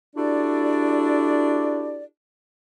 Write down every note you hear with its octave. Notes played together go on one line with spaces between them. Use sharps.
D4 E4 F#4 G4 A4 D5